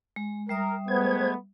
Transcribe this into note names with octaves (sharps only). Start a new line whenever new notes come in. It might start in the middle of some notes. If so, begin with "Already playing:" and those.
G#3
G3 A#4 E5 D#6
G#3 A3 B3 C5 G#6